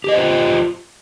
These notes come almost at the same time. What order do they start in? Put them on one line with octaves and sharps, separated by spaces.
G4 D#5 C5 F4